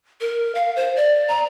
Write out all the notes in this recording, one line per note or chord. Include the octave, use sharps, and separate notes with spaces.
A#4
F5
C5
D5
A#5